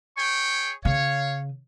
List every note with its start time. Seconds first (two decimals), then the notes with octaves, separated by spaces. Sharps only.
0.17 G#4 C#5 G5 C#6
0.85 C#3 C#5 F5